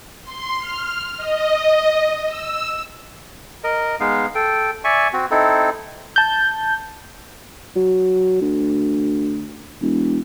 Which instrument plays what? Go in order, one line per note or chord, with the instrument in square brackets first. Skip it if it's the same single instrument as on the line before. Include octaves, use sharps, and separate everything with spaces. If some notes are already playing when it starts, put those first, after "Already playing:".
[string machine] C6
F6
D#5
E6
[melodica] A#4 D#5
G#3 B3 D#4 F5
A4 G5
D5 E5 G#5 C#6
C4 F#4
C4 D#4 E4 A4
[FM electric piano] A5 G6
[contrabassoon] F#3
D2
E1